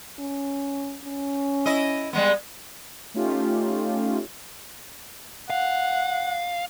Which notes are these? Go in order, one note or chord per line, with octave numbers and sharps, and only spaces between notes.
C#4
C#4
E4 D#5
G3 G#3 B3
A3 C#4 D#4 F4 G4
F5 F#5